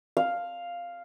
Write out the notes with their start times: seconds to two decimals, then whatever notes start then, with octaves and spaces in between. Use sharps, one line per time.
0.17 F5